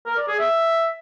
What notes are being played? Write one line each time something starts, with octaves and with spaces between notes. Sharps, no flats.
A#4
D5
G#4
E5